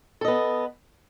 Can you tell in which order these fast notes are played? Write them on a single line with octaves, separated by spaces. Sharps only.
A4 D#5 B3